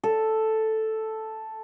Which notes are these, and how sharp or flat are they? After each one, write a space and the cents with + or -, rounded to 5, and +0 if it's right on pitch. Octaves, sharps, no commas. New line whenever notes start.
A4 +0